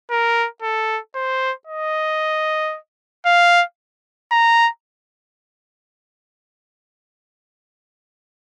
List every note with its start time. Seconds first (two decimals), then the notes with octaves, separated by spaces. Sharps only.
0.10 A#4
0.62 A4
1.15 C5
1.67 D#5
3.26 F5
4.31 A#5